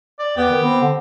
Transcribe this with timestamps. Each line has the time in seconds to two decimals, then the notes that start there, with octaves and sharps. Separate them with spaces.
0.19 D5
0.37 E2 B3 G4 G5
0.49 D#3
0.62 B3 C4
0.80 D3